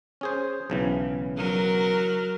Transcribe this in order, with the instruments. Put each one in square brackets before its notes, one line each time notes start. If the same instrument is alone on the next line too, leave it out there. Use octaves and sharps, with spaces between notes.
[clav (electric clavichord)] C#4 G#4 C5
B1 C#3 E3
[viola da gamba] F#3 A#4